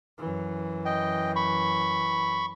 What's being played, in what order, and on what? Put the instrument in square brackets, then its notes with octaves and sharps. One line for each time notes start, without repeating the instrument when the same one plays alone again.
[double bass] F#2 E3
[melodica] D#5 G5
B5 C#6